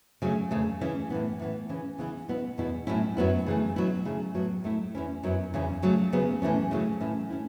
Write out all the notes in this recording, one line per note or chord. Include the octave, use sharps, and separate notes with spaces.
C#3 F#3 A3
E2 C#3 A3 C#4
C#3 E3 C#4 E4
A2 E3 B3
A2 E3 B3
C#3 E3 C#4
C#3 E3 B3 E4
B2 B3 E4
E2 B2 B3 E4
A2 F#3 C#4 E4
F#2 F#3 B3 E4
C#3 E3 A3
B2 F#3 B3 E4
C#3 A3 E4
A2 F#3 B3
A2 A3 E4
E2 E3 C#4 E4
F#2 F#3 B3 E4
E2 C#3 E3 C#4 E4
C#3 F#3 A3
C#3 F#3 B3
A2 E3 A3 C#4
C#3 F#3 A3 C#4 E4
A2 E3 C#4 E4
A3 C#4 E4